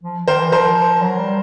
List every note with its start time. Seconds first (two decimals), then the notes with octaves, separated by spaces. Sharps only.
0.03 F3
0.28 D#3 A#4 C5
0.41 E3
0.52 F3 A#4 C5
1.02 F#3
1.18 G3